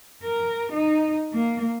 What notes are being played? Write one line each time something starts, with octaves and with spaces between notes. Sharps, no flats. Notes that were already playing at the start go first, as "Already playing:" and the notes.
A#4
D#4
A#3